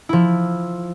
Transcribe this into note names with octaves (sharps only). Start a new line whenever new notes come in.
F3 E4